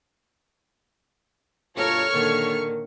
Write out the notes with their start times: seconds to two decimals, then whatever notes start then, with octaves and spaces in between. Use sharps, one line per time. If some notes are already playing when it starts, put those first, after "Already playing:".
1.77 G2 B2 F4 A4 A#4 C#5 C#6 F6
2.12 A#2 D3 D#3 A#4